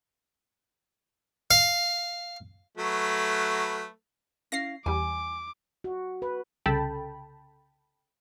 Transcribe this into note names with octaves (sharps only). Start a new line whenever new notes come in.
F5
F#3 A3 B4
C#4 E4 F5 A#6 C7
E2 G3 G#5 D6
F#4
B4
C2 C#3 A4 G5 A5 B5